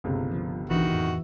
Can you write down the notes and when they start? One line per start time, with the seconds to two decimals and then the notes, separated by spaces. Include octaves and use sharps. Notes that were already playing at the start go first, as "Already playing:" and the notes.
0.04 G1 C#2 C3
0.31 F3
0.70 B1 D#3 E3 D4 F#4 E5
0.92 F2 A2